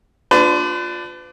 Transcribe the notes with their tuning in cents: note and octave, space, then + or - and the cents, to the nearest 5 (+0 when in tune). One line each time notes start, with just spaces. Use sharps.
D4 +0 F4 +10 B4 +40